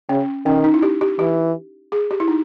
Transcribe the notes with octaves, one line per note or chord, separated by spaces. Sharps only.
C#3 C#4
D#3 C#4
D#4
E4
G4
G4
E3 G4
G#4
G4
E4
D#4